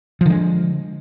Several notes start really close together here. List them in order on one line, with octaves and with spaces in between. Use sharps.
F3 D3 G#3